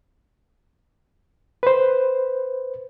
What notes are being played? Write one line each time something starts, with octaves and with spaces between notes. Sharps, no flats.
B4 C5